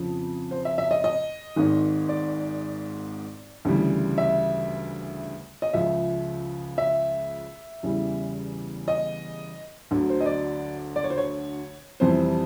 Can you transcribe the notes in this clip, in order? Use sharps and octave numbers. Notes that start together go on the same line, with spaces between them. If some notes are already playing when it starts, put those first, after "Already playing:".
Already playing: F2 C#3 F3
C5
E5
E5
D#5
D#5
G#1 G#2 D#3
D5
D2 C#3 E3 G3
E5
D#5
C#2 C#3 F3 E5
E5
E2 C#3 E3 G3
D#5
D2 D3 F#3
C5
D#5
D5
D5
C#5
C5
C#5
F2 C3 E3 G3 C5